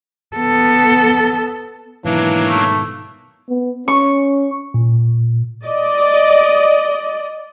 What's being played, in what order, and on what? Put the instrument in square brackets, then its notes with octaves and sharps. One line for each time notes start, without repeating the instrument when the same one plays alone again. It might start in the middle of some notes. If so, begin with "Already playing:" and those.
[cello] B3 A4
[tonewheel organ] G#2 B2 D#3 [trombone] E3 [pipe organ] F#3 A#3 D4
[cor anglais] A3
[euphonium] B3
[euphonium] C#4 [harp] C#6
[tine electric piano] A#2
[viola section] D5 D#5